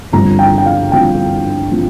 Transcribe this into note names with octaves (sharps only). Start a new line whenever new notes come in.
G1 G2 F3 C4 A#5
G5
G5
F5
G1 G2 F3 C4 G5
F3 C4